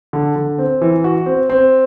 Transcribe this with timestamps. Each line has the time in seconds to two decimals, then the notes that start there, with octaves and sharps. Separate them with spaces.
0.13 D3
0.36 D3
0.58 C4
0.81 E3
1.04 F#4
1.26 C4
1.49 C4